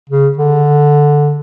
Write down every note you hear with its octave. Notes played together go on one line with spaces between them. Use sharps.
C#3
D3